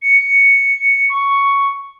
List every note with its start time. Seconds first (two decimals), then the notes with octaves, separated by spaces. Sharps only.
0.02 C#7
1.10 C#6